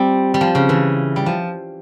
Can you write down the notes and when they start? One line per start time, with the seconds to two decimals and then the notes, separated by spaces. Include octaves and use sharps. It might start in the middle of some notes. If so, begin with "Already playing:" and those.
Already playing: G3 C4 F4
0.34 G3
0.41 F3
0.55 C#3
0.69 E3
1.16 G3
1.26 F3